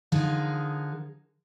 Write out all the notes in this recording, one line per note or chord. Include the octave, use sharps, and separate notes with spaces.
D3 F3 D#4 G#4 A#4